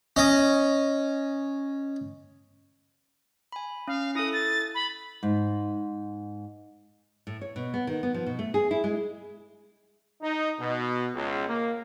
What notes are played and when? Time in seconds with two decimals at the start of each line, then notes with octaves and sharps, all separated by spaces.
0.16 C#4 D#5
3.52 G#5 B5
3.88 C#4 F5
4.15 E4 A4 D#6
4.33 A6
4.75 B5
5.23 G#2
7.27 A2
7.41 C#5
7.56 B2
7.74 B3
7.87 D#3
8.03 B3
8.14 F3
8.26 B2
8.39 A3
8.54 G#4
8.71 E4
8.84 G#3
10.21 D#4
10.58 B2
11.14 C#2
11.47 A#3